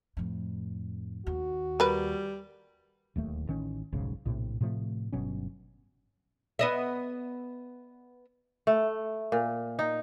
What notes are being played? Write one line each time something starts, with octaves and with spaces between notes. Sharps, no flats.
F2 A2
D#2 F#4
G3 A#4 B4
D1 D#2 A3
A1 D#3 C#4
F1 B1 G#2 C#3
A#1 A2 C3
A2 C3 F3 A3
G1 B2 F#3 C#4
B3 D#5 E5
A3
A#2
D#4